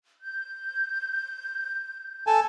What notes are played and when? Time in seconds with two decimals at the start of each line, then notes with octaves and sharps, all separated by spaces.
0.20 G6
2.27 A4 G#5 A5